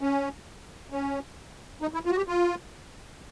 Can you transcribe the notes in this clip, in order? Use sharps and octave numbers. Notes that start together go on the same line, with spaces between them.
C#4
C#4
D#4
E4
F4
F#4
G4
F4